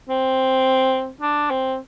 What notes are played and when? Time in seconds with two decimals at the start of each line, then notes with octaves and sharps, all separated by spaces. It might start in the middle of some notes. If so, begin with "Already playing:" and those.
0.09 C4
1.21 D4
1.50 C4